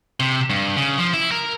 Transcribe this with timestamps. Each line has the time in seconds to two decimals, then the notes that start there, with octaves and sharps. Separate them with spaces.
0.20 C3
0.50 G2
0.76 C#3
0.98 F3
1.14 E4
1.32 A#4